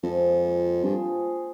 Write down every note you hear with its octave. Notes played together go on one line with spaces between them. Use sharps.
F2 F3 G#3 C4
A#3 F4 C5
G2 F3 C4 F4 G#4